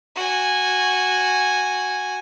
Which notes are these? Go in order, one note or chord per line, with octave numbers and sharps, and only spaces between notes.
F#4 G#5